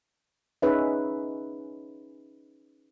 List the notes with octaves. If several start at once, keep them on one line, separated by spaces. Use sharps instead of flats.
C#4 D#4 G#4 B4 C#5 E5